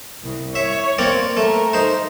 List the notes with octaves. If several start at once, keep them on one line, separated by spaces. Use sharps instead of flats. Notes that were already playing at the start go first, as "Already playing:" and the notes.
C2
C#5 E5
A#3 C4 D5
A3 A#4
D#4 C5